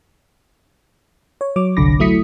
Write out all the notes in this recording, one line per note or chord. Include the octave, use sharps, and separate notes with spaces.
C#5
F#3 C#5 D6
G1 C2 D3 B5 D6 A#6
F#3 A3 E4 D#6 B6 C#7